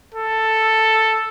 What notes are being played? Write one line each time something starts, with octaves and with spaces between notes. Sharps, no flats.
A4